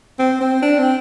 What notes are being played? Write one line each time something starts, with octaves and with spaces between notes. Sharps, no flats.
C4
C4
D4
C4